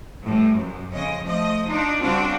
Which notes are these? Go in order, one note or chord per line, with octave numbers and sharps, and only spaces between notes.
A2 E3 G3
F#2
F2 C#3 C#4 D#5
F3 A3 D#5
D4 D#4 F4
C#3 G3 C4 D4 F4 F#4